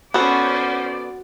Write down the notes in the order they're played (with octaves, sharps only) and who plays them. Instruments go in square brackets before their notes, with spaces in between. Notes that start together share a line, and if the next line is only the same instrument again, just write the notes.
[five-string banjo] B3 A4 [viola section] C#4 C5 [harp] F#4 [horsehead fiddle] D5